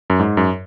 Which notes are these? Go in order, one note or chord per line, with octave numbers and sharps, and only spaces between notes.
F#2
G#2
F#2